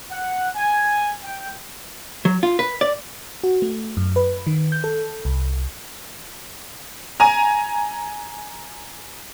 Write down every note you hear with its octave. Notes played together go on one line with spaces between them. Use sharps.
F#5
G#5
G5
F#3
F4
B4
D5
F#4
A3
F#2
B4
D#3
G6
A4
C2
G#5 A#5